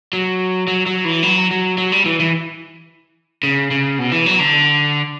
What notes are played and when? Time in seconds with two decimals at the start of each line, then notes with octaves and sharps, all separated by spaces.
0.13 F#3
0.68 F#3
0.86 F#3
1.05 E3
1.23 F#3
1.51 F#3
1.78 F#3
1.92 G3
2.05 E3
2.20 E3
3.43 C#3
3.71 C#3
3.99 B2
4.12 E3
4.26 F#3
4.40 D3